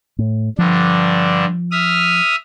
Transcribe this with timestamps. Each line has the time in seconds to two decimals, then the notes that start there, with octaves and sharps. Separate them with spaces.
0.19 A2
0.58 G2 D3 F3 D4
1.71 E5 D#6 F6